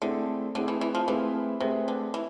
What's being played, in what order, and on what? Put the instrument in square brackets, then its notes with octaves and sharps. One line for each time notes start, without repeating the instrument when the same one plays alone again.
[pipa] D3 [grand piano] A3 C4 E4 G#4
[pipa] D3 [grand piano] A3 C4 E4 G#4
[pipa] E3
E3
F3
[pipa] E3 [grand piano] A3 C4 G#4 B4
[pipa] C3 [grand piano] A3 C4 G#4 B4
[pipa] D3
E3